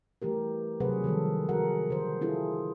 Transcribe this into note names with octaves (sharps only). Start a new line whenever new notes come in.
E3 A3 G4 A#4
C3 F#3 G#4 B4 C5 F#5
D#3 F3 G3 A4
D#3 F#4 G#4 A#4 F#5
D3 C5
D4 E4 F4 G#4 A4